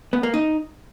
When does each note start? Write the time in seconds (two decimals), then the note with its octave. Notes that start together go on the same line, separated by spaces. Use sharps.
0.13 B3
0.23 A#3
0.34 D#4